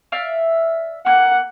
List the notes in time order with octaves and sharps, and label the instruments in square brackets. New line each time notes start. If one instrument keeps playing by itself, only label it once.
[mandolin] D5 E5 F5
[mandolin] A#3 [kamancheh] F#5